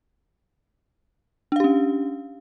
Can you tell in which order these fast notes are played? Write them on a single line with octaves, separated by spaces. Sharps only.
D4 F5 G4 C#4